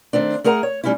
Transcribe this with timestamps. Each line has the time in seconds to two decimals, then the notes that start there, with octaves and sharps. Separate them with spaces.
0.13 D#3 A3 C4 D4
0.44 A3 G#4 A#4 F#5 A#5
0.63 C#5
0.84 G3 A3 C#4 D#4 E4